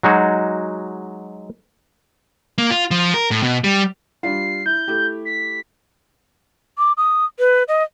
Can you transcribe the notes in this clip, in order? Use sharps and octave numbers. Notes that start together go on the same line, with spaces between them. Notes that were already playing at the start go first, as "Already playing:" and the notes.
F#3 G#3 D#4 F#4
A#3
F4
F3
A#4
A2
B2
G3
G3 D4 F4 C7
E4 G6
A3 E4 G4
B6
D6
D#6
B4
D#5